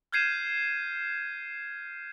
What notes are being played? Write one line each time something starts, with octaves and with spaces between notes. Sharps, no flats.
F6 G6 G#6 C7 D#7 E7